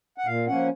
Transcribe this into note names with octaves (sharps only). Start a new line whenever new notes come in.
F#5
A#2 F5
F3 A#3 C#4 F#5